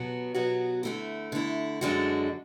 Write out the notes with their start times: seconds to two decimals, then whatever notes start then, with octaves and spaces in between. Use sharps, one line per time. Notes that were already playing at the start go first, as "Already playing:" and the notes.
Already playing: B2 F#3 B3 F#4
0.34 B2 F#3 B3 F#4
0.83 D3 A3 E4
1.32 D3 A3 E4
1.81 F#2 D3 G#3 D4 F#4